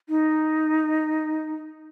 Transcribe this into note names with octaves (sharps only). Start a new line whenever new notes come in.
D#4